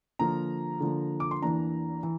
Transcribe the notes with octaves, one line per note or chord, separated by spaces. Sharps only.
D3 F3 A#3 A#5
D3 F3 A#3
D6
C6
E2 E3 A#3 D4 A#5
E3